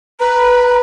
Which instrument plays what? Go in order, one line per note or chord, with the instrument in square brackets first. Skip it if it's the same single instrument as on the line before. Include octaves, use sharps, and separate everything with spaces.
[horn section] B4 [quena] A#5